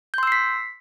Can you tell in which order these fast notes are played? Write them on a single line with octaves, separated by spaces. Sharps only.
G6 C6 E6 C7 B6